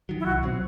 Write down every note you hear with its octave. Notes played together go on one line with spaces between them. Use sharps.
D#3 F#3
E4
C2 F#4
B2 F#3 C4